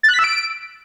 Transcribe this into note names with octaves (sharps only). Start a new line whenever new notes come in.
A6
F#6
B6
E6
D7